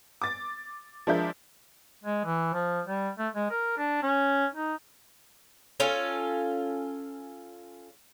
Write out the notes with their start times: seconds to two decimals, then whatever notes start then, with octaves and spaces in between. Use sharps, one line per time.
0.22 D6 A6
1.07 F3 G#3 D4 A#4 E5 G6
2.04 G#3
2.25 E3
2.53 F3
2.86 G3
3.18 A3
3.35 G#3
3.51 A#4
3.78 D4
4.03 C#4
4.54 D#4
5.80 C#4 F4 A4